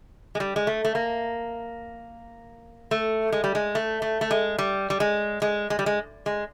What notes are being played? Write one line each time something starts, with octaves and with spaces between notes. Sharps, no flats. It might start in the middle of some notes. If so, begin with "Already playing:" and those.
G#3
G3
G#3
A3
A3
A#3
A3
G#3
G3
G#3
A3
A3
A3
G#3
G3
G3
G#3
G#3
G#3
G3
G#3
G#3